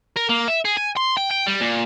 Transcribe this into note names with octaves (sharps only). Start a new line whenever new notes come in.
A#4
A#3
E5
G#4
G#5
C6
G5
G5
G3
A#2